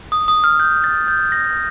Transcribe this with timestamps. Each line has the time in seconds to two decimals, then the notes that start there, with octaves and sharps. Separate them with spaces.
0.12 D#6
0.28 D#6
0.44 F6
0.60 G6
0.84 A6
1.08 G6
1.32 A#6